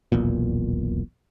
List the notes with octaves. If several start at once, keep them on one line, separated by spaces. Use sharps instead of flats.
D#1 B1 E2 A#2